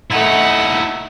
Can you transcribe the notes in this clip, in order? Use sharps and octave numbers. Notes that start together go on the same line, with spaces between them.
A3 D#4 E4 F#5